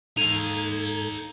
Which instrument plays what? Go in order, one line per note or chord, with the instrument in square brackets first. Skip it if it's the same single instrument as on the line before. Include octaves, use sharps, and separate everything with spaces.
[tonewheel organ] G#2 A4 G#6 [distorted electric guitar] D#4 F5 [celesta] D#7 F7